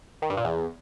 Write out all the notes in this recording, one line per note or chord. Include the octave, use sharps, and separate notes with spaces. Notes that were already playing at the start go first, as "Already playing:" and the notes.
D#3
G2
A#2
E2